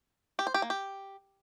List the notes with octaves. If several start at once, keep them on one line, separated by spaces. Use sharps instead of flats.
G4
C5
G4
A#3
G4